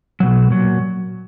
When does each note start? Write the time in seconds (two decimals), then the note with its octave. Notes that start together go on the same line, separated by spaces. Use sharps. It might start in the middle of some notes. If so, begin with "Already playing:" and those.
0.20 B2 F#3
0.50 A#2 F#3